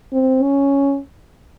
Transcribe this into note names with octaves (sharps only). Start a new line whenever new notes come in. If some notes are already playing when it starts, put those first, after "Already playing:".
C4
C#4